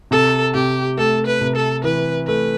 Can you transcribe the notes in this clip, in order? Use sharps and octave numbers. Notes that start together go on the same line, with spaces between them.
C3 A4
C3 G4
A3 A4
B4
C3
A4
E3 B4
A3 B4